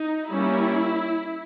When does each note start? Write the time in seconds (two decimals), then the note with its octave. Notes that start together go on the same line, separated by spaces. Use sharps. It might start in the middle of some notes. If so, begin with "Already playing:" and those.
Already playing: D#4
0.29 G3 A#3 C#4 E4